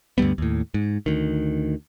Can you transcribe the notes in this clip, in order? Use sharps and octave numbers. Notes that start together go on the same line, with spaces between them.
D2 G2 G3 B3
D#2 A2
G#2
D2 D#3